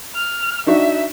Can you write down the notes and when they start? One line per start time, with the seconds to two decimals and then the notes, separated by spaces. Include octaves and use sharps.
0.15 F6
0.67 D4 D#4 F#4 E5